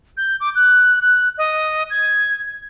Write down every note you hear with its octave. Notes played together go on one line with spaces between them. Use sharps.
G6
D6
F#6
F#6
D#5
G#6